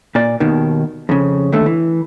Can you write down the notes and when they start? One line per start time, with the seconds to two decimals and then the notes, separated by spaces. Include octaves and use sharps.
0.15 A#2 D5
0.40 D#2 B2 D#3
1.09 F2 C#3
1.52 D#2 D3 A3
1.66 E3